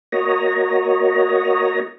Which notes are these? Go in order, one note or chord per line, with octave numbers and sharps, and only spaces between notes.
A#3 F#4 C#5 D#5 A#5